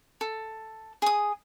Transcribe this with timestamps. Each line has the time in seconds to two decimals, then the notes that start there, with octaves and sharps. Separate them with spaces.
0.21 A4
1.02 G#4 D#6